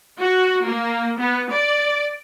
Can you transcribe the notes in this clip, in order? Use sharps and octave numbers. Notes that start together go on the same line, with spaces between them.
F#4
A#3
B3
D5